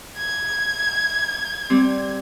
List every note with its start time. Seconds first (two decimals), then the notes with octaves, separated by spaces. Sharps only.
0.18 G#6
1.70 G3 C4